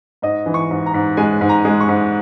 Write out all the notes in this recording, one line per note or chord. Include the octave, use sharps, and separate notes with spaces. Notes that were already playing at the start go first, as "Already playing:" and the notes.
G#2 D#5
E3
C#6
G#2
A#5
G#2
G#3 G#5
G#2
A#5
G#3
C#6
G#2